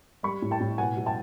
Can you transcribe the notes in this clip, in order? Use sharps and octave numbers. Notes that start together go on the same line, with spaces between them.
G3 B5 C#6
A2
G5 A5
A2
B2 F#5 G#5
F#3
G5 A5